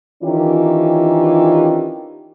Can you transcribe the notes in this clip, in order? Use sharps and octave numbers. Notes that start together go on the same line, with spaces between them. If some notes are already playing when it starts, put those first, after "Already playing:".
D#3 E3 C#4 D4 F4 G4